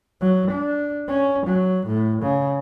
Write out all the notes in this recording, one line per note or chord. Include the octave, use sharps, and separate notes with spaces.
F#3
D4
C#4
F#3
A2
C#3